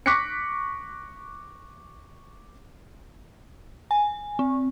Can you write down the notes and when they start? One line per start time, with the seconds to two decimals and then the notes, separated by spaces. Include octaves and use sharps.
0.06 C#6 D6 F#6 A#6 B6 C#7
3.91 G#5
4.39 C4